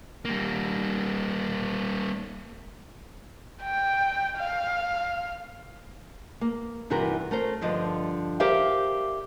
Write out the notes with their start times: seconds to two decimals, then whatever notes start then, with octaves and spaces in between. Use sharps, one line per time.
0.25 G3 A#3
3.62 G5
4.38 F5
6.41 A#3
6.90 G2 C3 E3 F#4 A#4
7.31 A3 A#4 C5
7.61 G2 D3 F3 D#5
8.40 G4 A#4 C5 D5 E5 F5